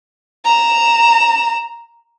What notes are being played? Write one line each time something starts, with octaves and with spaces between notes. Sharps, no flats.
A#5 E7